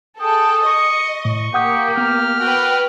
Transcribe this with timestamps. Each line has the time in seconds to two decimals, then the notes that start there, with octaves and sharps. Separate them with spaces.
0.20 G#4 A4 G5 D#6
0.67 D#5 C#6
1.25 A2 C#6
1.54 A#3 G4 F#5 D#6 G6
1.97 B3 F6
2.40 F#4 B4 G5